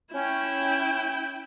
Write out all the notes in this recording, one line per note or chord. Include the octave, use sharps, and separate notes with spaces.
C#4 E4 G5